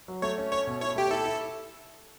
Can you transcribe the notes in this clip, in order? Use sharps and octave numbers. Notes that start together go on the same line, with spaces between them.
F#3
A3 C#5
C#4
C#4 C#5
B2
E4 C#5
A3 G4
E4 A4
E4